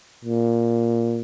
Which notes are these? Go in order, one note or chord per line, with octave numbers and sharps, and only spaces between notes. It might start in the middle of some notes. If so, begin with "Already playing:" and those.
A#2